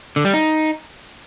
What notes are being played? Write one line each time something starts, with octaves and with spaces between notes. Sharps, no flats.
D3
G3
D#4